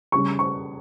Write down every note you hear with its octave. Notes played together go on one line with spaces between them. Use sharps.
C#3 G3 C#4 C#6
C#6